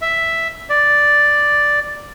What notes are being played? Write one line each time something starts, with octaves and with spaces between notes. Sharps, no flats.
E5
D5